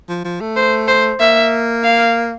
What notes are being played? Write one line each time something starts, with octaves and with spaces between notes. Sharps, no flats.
F3
F3
A3
C5
C5
A#3 E5
F5